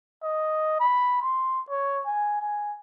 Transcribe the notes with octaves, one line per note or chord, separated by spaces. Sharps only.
D#5
B5
C6
C#5
G#5
G#5